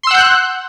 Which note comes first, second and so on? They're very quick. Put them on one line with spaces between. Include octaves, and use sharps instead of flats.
C6 E6 F#5 G6 F#6